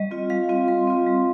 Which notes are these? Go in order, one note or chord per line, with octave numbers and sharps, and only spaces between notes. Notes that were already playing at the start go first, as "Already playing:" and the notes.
Already playing: G3 D#5
C4 F4
G3 F5
C4 F4
G3 C6
C4 F4
G3